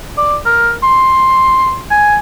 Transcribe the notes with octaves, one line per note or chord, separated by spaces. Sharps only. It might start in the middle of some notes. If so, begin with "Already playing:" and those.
D5
A#4
C6
G#5